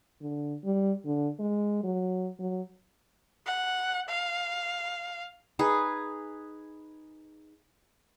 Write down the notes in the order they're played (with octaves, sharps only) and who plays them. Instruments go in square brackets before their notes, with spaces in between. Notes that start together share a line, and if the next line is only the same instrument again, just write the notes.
[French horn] D3
G3
D3
G#3
F#3
F#3
[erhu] F#5
F5
[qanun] D#4 G#4 B4